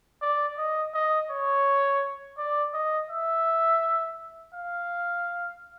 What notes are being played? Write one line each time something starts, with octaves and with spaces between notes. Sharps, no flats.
D5
D#5
D#5
C#5
D5
D#5
E5
F5